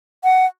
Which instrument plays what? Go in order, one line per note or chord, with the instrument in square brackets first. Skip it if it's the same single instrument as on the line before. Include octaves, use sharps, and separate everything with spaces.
[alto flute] F#5